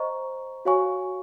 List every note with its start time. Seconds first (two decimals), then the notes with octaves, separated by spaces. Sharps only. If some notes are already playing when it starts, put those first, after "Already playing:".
Already playing: C5 D#5 A#5 C#6
0.65 F#4 C#5 F5 G#5 C#6